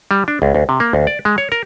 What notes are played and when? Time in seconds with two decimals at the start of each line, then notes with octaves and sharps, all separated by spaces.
0.11 G3
0.28 D4
0.42 C#2
0.55 D2
0.69 C3
0.80 A#3
0.93 D2
1.07 D5
1.25 G#3
1.38 C#5
1.52 A#4